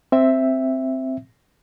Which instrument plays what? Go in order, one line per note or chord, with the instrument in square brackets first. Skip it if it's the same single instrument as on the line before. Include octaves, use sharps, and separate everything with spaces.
[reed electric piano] C4 E5